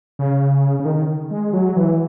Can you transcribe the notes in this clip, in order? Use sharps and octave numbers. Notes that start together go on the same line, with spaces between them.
C#3
C#3
D#3
G#3
F#3
E3